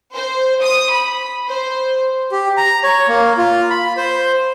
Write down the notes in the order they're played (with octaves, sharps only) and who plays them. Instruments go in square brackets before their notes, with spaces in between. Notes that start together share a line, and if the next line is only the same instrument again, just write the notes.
[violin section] C5
D#6
B5
C5
[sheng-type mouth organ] G4
A#5
C#5
A#3
F4
B5
C5